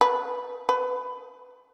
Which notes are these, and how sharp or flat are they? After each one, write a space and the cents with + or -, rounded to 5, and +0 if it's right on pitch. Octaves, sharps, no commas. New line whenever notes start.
B4 -5
B4 +20